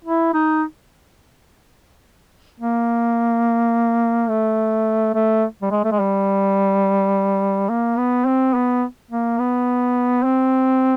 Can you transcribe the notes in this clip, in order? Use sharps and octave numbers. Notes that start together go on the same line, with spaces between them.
E4
D#4
A#3
A3
A3
G3
G#3
A3
G#3
G3
A#3
B3
C4
B3
A#3
B3
C4